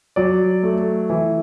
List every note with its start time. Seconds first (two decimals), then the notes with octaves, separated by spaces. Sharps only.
0.16 F#3 D5
0.63 A3
1.10 E3